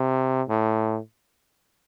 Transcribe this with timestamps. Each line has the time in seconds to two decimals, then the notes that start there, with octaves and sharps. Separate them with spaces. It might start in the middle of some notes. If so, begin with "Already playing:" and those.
Already playing: C3
0.49 A2